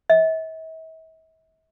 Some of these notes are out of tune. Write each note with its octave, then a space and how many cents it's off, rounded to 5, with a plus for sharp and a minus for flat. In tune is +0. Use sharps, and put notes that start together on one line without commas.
E5 -45